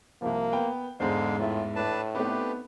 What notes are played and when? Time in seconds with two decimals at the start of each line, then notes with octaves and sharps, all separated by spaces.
0.22 C2 F3 A#3
0.53 B3 G5
1.00 E2 G#2 D3 G#3 C5 F5
1.39 A2 E3 F4 E5
1.76 A2 D4 B4 A5
2.15 A3 B3 C4 D4 D#4 G4 B4